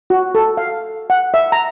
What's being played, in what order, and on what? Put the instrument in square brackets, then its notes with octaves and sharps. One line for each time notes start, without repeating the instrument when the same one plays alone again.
[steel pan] F#4
A4
F5
F#5
E5
A#5